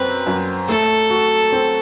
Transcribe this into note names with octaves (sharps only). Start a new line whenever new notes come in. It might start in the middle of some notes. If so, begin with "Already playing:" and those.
Already playing: F#2 C4 B4
F#2
A3 A4
F#4
C4